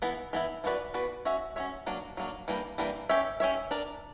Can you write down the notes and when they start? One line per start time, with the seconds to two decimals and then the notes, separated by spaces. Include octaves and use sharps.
0.02 E3 B3 E4
0.33 E3 B3 E4
0.64 E3 B3 F#4 B4 D5
0.94 E3 B3 F#4 B4 D5
1.25 C#4 F#4 C#5 E5
1.56 C#4 F#4 C#5 E5
1.86 F#3 A#3 D4
2.17 F#3 A#3 D4
2.48 E3 G3 A#3 D4
2.78 E3 G3 A#3 D4
3.09 C#4 G4 C#5 E5
3.40 C#4 G4 C#5 E5
3.71 D4 A#4 D5